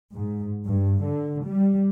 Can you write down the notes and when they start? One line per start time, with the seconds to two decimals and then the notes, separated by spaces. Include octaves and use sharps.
0.13 G#2
0.65 G2
1.02 D3
1.44 G3